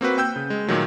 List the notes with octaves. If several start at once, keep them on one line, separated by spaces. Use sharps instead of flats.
A#3 C4 F#4 B4
G5 E6 G6
C#3
G#3
A#2 D#3 F#3 A3